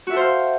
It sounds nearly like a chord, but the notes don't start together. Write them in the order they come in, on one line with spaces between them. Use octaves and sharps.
F#4 E5 A4 C5 F5